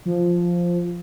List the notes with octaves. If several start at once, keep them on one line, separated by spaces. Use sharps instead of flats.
F3